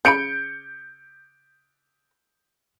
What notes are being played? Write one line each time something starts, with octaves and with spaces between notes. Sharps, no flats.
C#3 F4 B5 G6 C#7 D7